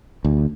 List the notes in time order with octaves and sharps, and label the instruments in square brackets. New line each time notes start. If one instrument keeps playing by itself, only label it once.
[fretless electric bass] D2